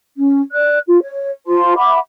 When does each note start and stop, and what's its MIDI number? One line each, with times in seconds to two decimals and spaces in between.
0.16 0.40 61
0.52 0.78 74
0.52 0.78 90
0.87 1.00 65
1.01 1.30 73
1.46 1.74 65
1.46 1.74 72
1.46 1.74 81
1.46 1.74 84
1.76 1.97 76
1.76 1.97 78
1.76 1.97 83
1.76 1.97 86